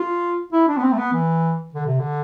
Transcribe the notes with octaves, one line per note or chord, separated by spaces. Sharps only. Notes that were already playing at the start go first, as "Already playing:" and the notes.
Already playing: F4
E4
D4
B3
C4
A3
B3
E3
D3
C3
D3